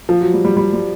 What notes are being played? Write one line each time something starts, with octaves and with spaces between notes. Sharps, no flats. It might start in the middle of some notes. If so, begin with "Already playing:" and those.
F3
F#3
G3
G3
G3
G3